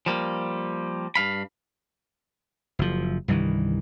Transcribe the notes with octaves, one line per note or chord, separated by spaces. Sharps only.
F3 G3 A#3
G2 F5 B5
F#1 F3
C2 G2 D#3 E3